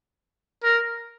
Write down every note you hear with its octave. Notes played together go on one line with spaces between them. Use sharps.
A#4